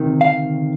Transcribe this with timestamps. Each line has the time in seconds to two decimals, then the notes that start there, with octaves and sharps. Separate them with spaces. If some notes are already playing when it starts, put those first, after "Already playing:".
Already playing: D2 C3 D#3
0.21 F5